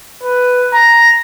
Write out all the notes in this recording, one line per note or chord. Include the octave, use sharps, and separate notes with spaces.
B4
A#5